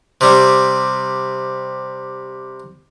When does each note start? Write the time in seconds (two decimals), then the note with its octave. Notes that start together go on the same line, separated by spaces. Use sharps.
0.21 C3 G3